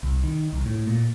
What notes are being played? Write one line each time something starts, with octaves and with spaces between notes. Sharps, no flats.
C2
D#3
C2
A2
A#2